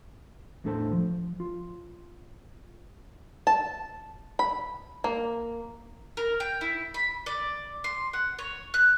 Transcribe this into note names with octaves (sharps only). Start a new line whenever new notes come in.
E2 A2 D4 A4 C5 A5
F3
F4
A5
B5
A#3
A#4
G5
E4
B5
D5
C6
F#5
C#5
F#6